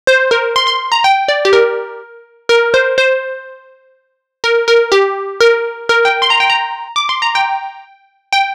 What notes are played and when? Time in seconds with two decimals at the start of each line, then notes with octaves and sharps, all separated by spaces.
0.07 C5
0.31 A#4
0.56 C6
0.67 C6
0.92 A#5
1.04 G5
1.28 D5
1.45 G4
1.53 A#4
2.49 A#4
2.74 C5
2.98 C5
4.44 A#4
4.68 A#4
4.92 G4
5.40 A#4
5.89 A#4
6.05 G5
6.22 C6
6.30 A#5
6.40 G5
6.50 A#5
6.96 D6
7.09 C6
7.22 A#5
7.35 G5
8.33 G5